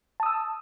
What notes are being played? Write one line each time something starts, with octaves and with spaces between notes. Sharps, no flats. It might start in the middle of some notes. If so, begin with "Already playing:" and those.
A5 D#6 E6